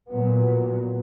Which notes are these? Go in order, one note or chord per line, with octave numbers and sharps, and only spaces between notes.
A#2 F#3 B3